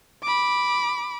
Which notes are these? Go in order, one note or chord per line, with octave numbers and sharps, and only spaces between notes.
B5 D6